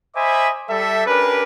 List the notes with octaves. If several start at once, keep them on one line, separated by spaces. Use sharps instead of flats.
C5 D#5 E5 G#5 B5 D6
G3 A4 E5
C#4 D4 G4 A#4 B4